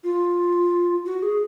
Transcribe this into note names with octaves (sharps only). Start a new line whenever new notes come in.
F4
F#4
G#4